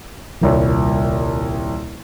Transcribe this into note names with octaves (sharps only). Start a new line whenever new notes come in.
D#1 C2 C#5